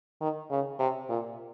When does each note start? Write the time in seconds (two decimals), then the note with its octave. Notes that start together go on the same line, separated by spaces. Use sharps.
0.21 D#3
0.50 C#3
0.79 C3
1.09 A#2